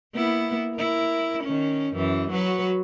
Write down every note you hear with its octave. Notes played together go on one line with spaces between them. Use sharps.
A#3 B3 E4
E4 A#4
D#3 C#4
F#2 E3
F#3 F#4 B4